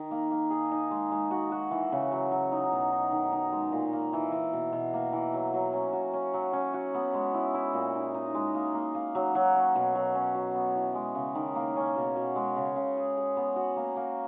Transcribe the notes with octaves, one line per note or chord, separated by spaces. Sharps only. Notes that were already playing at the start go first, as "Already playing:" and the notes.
Already playing: D#3
A#3
A#3
G#4
D#4
G#3
G#3
F#4
F#4
E3
C#3
F#3
F#3
D#4
B2
D#4
D#3
D#4
G#3
A#2
A#3
E3
E3
B2
B2
A#3
E3
F#3
F#3
C#4
F#4
C#4
F#3
C#4
F#4
B3
G#3
E4
E4
A#2
D#4
D#4
G#3
A#3
A#3
A#3
F#3
F#3
C#4
B2
F#3
C#4
F#3
B3
E3
G#3
C#3
D#3
A#3
C#4
B2
B2
G#3
C#3
C#3
G#4
G#4
B3
F#4
A#3
A#3